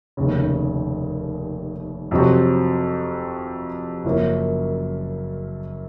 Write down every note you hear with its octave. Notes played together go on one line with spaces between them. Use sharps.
F1 D#2 C#3
F2 C3 F#3 C4 F#4
F#1 F#2 F3 A#3 C#4